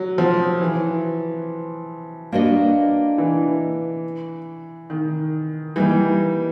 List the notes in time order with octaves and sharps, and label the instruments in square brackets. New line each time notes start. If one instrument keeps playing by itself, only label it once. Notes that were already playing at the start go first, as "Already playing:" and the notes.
Already playing: [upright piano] F#3
F3
E3
[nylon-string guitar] A#3 D4 F#4 B4 D#5
[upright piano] E3
D#3
[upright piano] E3 [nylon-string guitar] G3 A#3 D#4